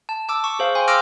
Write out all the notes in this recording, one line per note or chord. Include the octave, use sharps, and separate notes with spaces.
A5
A5 D6 E6
C#6
G#4 C5 F5
G5 G#5 C6
C6 D6 E6 F6 A#6 D7